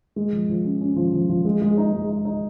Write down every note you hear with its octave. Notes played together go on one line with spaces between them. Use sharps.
G#3
F3
F3
C#4
C#4
F3
F3
F3
G#3
G#3
D#4
G#3
D#4
D#4